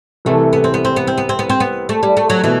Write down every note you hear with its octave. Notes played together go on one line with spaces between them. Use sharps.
C2 C3 E3 A3
B3
C4
B3
C4
B3
C4
B3
C4
B3
C4
B3
A3
G3
A3
F#3
B2 E3 A3 E4